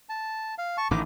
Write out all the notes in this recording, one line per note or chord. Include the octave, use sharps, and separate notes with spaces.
A5
F5
A5 C#6
A1 A2 D#3 D6